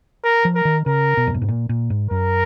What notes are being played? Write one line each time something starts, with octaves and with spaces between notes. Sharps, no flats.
A#4
F3
A#4
D#3
C#3 A#4
B2
F2
F#2
G#2
A#2
A#2
G#2
F#2 A#4